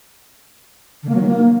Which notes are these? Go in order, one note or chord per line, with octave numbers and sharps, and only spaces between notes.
D3
A#3
F#3
D#3
A#3